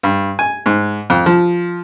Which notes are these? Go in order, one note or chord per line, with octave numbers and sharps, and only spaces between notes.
G2
G#5
G#2
F2
F3